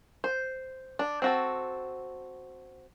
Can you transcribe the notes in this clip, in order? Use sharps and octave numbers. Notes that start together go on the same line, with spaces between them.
C5
D4
C4 F#4 A4